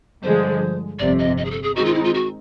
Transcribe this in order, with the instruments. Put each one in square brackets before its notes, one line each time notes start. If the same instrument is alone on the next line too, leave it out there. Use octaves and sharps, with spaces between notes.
[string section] G2 D3 F3 G#3 [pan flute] C5
[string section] G1 F2 C3 [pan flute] D5
[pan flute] D#5
D#5
G#4
A4
G#4
[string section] D#3 G#3 C4 D#4 [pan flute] F#4
[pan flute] F4
E4
F4
F#4